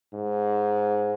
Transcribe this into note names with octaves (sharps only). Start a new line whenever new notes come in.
G#2